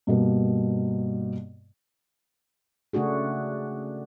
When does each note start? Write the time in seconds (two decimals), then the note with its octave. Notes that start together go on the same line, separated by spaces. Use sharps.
0.07 G2 B2 A#3
2.93 C#3 A3 D4 F#4 G#4